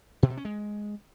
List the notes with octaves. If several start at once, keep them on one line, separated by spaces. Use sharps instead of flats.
B2
C3
C#4
G#3